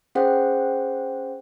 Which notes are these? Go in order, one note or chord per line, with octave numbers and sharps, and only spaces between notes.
C#4 G#4 C5 F#5 G5